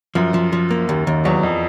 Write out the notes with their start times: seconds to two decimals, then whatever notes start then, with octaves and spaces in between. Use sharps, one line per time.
0.15 F#2 F3
0.34 F3
0.53 F3
0.71 A#3
0.89 D#2
1.07 D#2
1.25 E2 F#3
1.43 F2